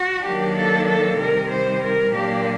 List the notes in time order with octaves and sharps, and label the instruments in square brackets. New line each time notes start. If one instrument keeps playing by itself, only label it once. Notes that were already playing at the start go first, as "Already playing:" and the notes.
Already playing: [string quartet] F#4
D#3 F#3 A#3 D4 G4
A4
A4
C3 D#3 G3 A#4
C5
A#4
A#2 F#3 A#3 D4 G4